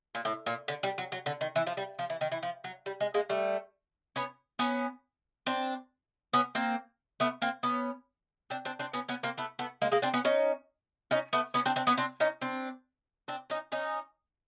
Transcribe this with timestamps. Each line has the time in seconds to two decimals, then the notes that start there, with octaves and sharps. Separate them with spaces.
0.15 A#2
0.25 A2
0.46 A#2
0.68 D3
0.83 G3
0.98 F#3
1.12 F#3
1.26 D3
1.41 D#3
1.56 E3
1.67 F3
1.77 G3
1.99 F3
2.10 E3
2.21 D#3
2.32 E3
2.43 F3
2.64 F#3
2.86 G3
3.01 G#3
3.14 G#3 A#3
3.29 G3 A3
4.16 B3 C#4
4.59 B3 C#4
5.46 C4 D4
6.33 B3 C#4
6.55 A#3 C4
7.20 A3 B3
7.42 A#3 C4
7.63 B3 C#4
8.50 C4 D4
8.65 C4 D4
8.79 C4 D4
8.93 B3 C#4
9.08 B3 C#4
9.23 A#3 C4
9.38 A3 B3
9.59 A3 B3
9.82 G#3 A#3
9.92 G#3 A#3
10.02 C4 D4
10.14 B3 C#4
10.25 C#4 D#4
11.11 C#4 D#4
11.33 A3 B3
11.54 B3 C#4
11.66 C4 D4
11.76 C4 D4
11.87 B3 C#4
11.98 C4 D4
12.20 C#4 D#4
12.41 C4 D4
13.28 C4 D4
13.50 C#4 D#4
13.72 C#4 D#4